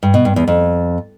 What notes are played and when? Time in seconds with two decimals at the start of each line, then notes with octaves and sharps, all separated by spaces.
0.03 G2
0.14 B2
0.25 G2
0.36 E2
0.48 F2